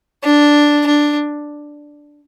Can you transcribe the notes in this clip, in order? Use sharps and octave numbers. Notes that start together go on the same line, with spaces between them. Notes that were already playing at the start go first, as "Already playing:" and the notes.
D4
D4